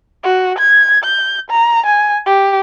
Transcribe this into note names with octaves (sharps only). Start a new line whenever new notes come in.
F#4
G#6
G6
A#5
G#5
G4